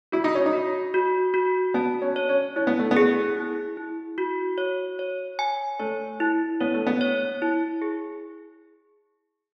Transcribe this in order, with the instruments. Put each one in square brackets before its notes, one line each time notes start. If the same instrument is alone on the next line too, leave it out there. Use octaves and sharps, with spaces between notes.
[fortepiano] E4 [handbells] F#4
[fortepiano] D#4
C#4
D#4
[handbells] F#4
F#4
F#4
[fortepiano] B3 [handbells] A5
[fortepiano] C#4
[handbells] C#5
[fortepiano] C#4
[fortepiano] C#4 [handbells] E4
[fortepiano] B3
A3
B3
[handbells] G#4
E4
E4
F#4
C#5
C#5
G#5
[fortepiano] A3 [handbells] C#5
[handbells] E4
[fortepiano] B3 [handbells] C#5
[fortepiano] A3
B3
[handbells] C#5
E4
G#4